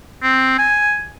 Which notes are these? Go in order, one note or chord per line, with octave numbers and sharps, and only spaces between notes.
C4
G#5